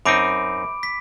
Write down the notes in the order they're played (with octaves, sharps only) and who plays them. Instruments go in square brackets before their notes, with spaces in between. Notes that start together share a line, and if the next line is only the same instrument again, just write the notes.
[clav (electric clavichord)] F#2 C4 D#4 [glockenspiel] B5 D6 D7
[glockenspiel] B6